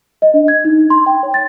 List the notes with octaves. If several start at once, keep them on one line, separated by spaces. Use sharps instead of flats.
D#5
D4
G#6
D#4
C6
G5
C#5
A6